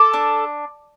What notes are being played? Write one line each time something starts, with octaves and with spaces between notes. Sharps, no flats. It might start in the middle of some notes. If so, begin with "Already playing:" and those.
Already playing: A4 D6
D4